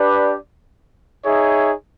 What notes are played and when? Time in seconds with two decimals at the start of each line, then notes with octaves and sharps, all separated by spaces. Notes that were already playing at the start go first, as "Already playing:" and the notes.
Already playing: D4 G4 B4 D5
1.25 D#4 G#4 C#5 E5